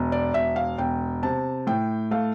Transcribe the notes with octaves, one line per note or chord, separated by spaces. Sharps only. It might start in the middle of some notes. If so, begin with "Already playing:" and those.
Already playing: E1
D5
E1 E5
F5
E1 G5
C3 A5
A2 G5
A3 F5